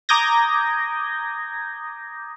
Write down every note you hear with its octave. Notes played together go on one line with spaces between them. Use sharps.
A#5 D6 D#6 G6 G#6 A#6